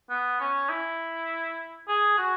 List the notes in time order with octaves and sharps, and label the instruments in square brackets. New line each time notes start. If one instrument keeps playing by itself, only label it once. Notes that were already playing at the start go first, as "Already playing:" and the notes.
[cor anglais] B3
C#4
E4
G#4
F#4